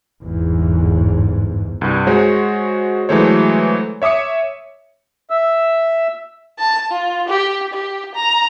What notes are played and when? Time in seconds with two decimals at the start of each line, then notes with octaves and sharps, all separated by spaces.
0.22 G1 E2 G#2
1.81 C2 G2
2.07 G#3 F#4 C5 C#5
3.09 E3 F#3 G#3 A3 C5 C#5
4.02 C#5 E5 D6 D#6 C#7
5.30 E5 E6
6.59 A5
6.91 F4
7.28 G4
7.73 G4
8.15 A#5